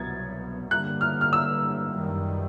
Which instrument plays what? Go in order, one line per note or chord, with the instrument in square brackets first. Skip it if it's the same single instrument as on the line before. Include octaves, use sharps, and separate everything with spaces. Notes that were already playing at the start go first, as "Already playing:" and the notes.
Already playing: [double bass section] C2 B2 F#3 B3 [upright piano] G#6 A6
[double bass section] G2 D3 G3 A#3 [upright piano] F#6
[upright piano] F6
F6
E6
[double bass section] F#2 D#3 G3